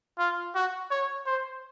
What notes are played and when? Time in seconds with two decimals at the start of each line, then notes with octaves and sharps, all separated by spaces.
0.18 F4
0.55 F#4
0.91 C#5
1.26 C5